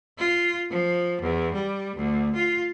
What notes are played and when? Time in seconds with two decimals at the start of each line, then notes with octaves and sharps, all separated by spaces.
0.18 F4
0.71 F3
1.21 E2
1.54 G3
1.96 D2
2.35 F4